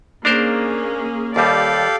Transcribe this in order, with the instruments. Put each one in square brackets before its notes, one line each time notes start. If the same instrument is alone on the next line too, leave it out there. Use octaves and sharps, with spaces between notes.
[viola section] A#3 C#4 G#4 [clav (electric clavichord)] D4 A#4 C5
[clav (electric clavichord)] D#2 G3 [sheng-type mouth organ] G4 A4 F5 [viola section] D5